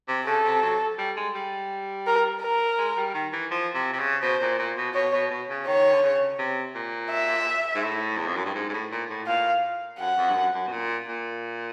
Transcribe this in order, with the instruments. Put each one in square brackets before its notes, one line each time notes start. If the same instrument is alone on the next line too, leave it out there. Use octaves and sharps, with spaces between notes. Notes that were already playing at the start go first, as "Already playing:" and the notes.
[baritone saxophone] C3
[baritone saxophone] C#3 [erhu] A4
[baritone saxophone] C3
F#3
G3
G#3
G3
[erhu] A#4
A#4
[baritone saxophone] G#3
G3
D#3
E3
F3
C3
C3
C#3
[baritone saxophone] B2 [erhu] C5
[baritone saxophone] A#2
A#2
B2
[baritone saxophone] B2 [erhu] C#5
[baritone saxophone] B2
B2
C#3
[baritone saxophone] D#3 [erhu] C#5
[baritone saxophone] D3
C#3
C3
A#2
[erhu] E5
[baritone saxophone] G#2
A2
E2
F2
F#2
G2
G#2
G#2
A2
A#2
A2
[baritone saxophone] A#2 [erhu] F5
[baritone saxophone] F#2 [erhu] F#5
[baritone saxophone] F2
G2
F#2
F#2
B2
A#2
A#2